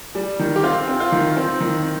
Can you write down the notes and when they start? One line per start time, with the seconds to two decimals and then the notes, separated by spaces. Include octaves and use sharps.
0.15 G3
0.39 D#3
0.56 G4
0.63 C4 F4
0.88 C4
1.00 F4
1.12 D#3
1.37 C4
1.60 D#3